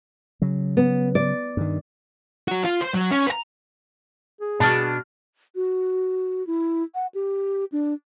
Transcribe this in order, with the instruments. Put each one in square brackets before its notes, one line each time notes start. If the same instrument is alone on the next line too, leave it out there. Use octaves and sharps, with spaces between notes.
[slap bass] C#3 F#3
[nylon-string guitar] B3
D5
[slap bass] G2 D#3
[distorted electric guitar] F#3 F#4
F4
C5
F#3
C#4
B4 A#5
[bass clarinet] G#4
[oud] B2 [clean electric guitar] D4 [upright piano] A5 F6
[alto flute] F#4
E4
F#5
G4
D4